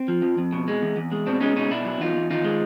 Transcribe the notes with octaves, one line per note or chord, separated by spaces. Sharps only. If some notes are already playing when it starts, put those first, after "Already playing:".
Already playing: C4
F3
F2
F2
B2
G#3
E2
E2
G#3
B2 C4 D4
G#3 C#4 D#4
B2 C#4 D#4
B2 D4 E4
F#3
E2 D#4 F4
E2
D#3 D#4 F4
G#3